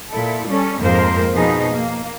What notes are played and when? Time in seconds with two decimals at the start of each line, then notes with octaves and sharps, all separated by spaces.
0.11 A#2 E4 A4
0.47 G3 C#4 A4
0.80 F2 G#2 F3 A#3 A#4 C5
1.33 B2 F3 B3 D#4 G#4
1.71 A#3